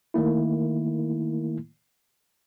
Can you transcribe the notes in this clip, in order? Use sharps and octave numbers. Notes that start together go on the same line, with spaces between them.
D#3 A3 A#3 E4